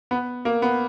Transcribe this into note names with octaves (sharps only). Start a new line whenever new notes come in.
B3
A#3
B3